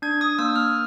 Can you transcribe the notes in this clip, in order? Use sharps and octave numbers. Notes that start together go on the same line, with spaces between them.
D4 G#6
D#6
A#3 E6
F6